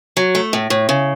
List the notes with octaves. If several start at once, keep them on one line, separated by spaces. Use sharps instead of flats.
F#3
A3
A2
A2
C#3